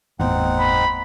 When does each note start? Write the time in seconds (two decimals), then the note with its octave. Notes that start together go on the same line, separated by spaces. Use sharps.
0.20 G1 E2 A2 B3 C4 D#4 F#5
0.59 B5